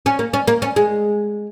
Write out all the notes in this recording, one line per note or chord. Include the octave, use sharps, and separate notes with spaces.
C#4
A#3
C#4
A#3
C#4
G#3